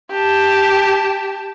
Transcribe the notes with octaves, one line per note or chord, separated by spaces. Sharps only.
G4 A5